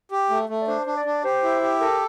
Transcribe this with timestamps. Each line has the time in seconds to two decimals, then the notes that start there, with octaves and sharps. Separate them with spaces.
0.11 G4
0.30 A3
0.49 A3
0.61 D5
0.67 D4 C5
0.86 D4
0.96 D5
1.05 D4
1.24 G4 C5
1.43 E4
1.62 G4
1.80 A4 A#4